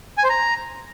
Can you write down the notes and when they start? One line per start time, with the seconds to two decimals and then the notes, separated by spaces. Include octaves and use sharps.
0.18 G#5
0.24 C5
0.29 A#5